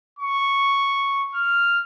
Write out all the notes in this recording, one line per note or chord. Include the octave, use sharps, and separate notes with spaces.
C#6
F6